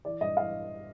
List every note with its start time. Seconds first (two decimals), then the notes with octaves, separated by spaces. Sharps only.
0.05 E3 D5
0.21 G2 D#5
0.37 E3 F5